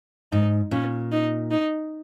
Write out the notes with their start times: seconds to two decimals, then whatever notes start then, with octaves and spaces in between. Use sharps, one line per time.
0.32 G#2 D#4
0.71 A#2 C#4
1.12 D#4
1.51 D#4